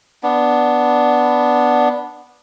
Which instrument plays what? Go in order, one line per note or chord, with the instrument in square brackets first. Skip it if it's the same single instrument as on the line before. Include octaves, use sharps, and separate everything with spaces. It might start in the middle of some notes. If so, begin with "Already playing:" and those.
[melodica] B3 D4